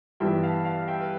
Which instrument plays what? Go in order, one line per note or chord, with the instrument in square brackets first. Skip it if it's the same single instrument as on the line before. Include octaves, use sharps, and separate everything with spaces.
[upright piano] G2 E3 B3 [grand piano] E5 G5
[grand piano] F5 A5
F5 A5
E5 G5
B4